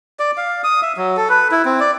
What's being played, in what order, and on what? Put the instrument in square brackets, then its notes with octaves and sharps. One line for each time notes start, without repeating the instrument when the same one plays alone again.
[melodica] D5
F5
D#6
E5
F#3
A4
B4
E4
C4
D5